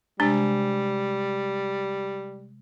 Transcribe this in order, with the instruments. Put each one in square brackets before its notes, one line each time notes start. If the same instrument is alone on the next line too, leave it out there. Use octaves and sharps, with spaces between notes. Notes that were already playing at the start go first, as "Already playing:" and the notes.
[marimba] C3 G#3 [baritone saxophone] G3 [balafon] D4